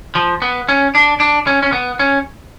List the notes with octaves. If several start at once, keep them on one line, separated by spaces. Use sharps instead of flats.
F3
B3
C#4
D4
D4
C#4
C#4
B3
C#4